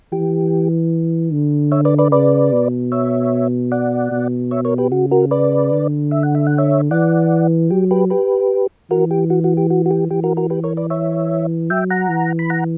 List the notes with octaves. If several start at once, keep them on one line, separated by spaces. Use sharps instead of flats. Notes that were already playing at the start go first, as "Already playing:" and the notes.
E3 G4
D3
C#5 E5
B4 D5
B4 D5
C#3 B4 D5
B2
C#5 E5
D5 F#5
B2
C#5 E5
A#4 C#5
G4 B4
C#3 F#4
F#4 A#4
B4 D5
D3
E5
F#5
E5
F#5
C#5 E5
E3 D5 F#5
F#3 G4
G4 B4
G4 B4
E3 F#4 A#4
G4
F#4
F#4
G4
F#4
F#4
G4
E3 G4
F#4 A#4
F#4 A#4
G4 B4
A#4 C#5
B4 D5
C#5 E5
F#3 E5 G5
F#5 A#5
E3
B5
F#5 A#5